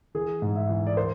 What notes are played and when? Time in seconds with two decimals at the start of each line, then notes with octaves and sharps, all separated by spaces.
0.15 E3 G#4
0.42 G#2
0.56 E5
0.69 E3
0.87 D5
0.97 C5